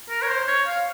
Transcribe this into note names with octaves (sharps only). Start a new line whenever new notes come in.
A#4
C#5
C5
C#5
F5